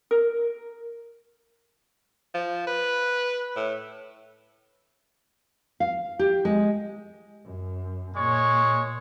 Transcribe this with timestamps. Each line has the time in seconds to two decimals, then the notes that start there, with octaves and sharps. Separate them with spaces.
0.11 A#4
2.34 F3
2.67 B4
3.56 A2
5.80 F5
6.19 G4
6.45 G#3
7.45 F#2
8.16 A#2 G#3 C#5 C#6